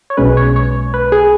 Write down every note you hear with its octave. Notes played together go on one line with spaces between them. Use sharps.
C#5
B1 B2 G#3 C#4 B4
C#5
C#5
B4
G#4